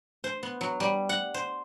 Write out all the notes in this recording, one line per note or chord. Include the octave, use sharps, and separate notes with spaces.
C5
B3
F#3
G3
F#5
C5